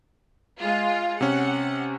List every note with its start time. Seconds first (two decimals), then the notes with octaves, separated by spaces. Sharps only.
0.60 G#3 F4
1.21 C3 C#4 F#5